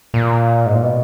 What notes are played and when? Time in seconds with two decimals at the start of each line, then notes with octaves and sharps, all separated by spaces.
0.14 A#2
0.66 G#2
0.74 A#2
0.83 B2